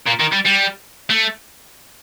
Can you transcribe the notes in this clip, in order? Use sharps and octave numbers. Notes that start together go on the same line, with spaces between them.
A#2
D#3
G3
G3
A3